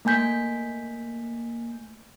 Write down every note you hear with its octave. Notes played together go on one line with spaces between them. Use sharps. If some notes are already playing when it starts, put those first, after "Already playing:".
A3 A#3 G#5 G6 B6